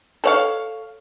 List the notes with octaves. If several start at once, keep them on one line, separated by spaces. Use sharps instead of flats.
A4 C#5 F5